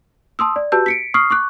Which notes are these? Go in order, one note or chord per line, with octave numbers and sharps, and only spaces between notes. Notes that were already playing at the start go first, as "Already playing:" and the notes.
A5 C6 D#6 E6
D5
F#4 G4 B4 A5 E6 G6
B6 C#7 D7
C#6 D#6 F6 C7
C#6 D6 F#6